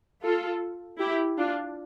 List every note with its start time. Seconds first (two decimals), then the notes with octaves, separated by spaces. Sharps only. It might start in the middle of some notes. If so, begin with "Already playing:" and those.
0.23 F4 A4
0.99 E4 G4
1.37 D4 F4